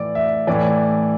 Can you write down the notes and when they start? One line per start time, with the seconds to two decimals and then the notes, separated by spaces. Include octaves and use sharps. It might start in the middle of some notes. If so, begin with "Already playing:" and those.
Already playing: A2 E3 D5
0.15 E5
0.47 A2 E3 D5